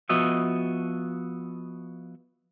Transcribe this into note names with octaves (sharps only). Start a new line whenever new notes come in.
F3 B3 F#4 D#5 E5